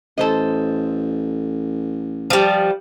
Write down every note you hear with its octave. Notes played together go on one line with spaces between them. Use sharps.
A1 A4 C5 D#5
F3 G3